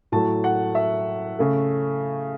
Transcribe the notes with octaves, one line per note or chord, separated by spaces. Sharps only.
A2 F#3 A3 A5
F#5
E5
C#3 A3